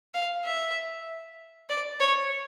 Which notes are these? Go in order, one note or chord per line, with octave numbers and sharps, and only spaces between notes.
F5
E5
D5
C#5